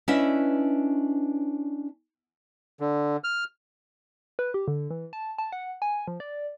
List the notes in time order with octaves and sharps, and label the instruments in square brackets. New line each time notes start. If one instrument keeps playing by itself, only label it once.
[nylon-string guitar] C#4 D4 E4 B4 D#5 E5
[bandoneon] D3
F6
[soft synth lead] B4
G4
D3
E3
A5
A5
F#5
G#5
F3
D5